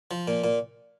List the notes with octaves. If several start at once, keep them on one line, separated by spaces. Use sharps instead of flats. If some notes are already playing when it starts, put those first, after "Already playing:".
F3
A#2
A#2